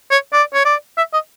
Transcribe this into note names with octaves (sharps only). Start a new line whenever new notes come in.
C#5
D5
C#5
D5
E5
D#5